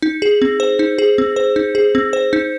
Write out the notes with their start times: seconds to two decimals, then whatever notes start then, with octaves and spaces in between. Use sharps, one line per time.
0.02 D#4
0.22 G#4
0.42 C4
0.60 C5
0.79 D#4
0.98 G#4
1.18 C4
1.36 C5
1.56 D#4
1.75 G#4
1.95 C4
2.13 C5
2.33 D#4